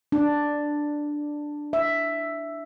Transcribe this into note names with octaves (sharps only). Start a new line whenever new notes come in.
D4
E5